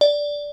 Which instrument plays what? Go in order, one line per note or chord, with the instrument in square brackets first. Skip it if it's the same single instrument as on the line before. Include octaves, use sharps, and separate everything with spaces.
[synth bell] D5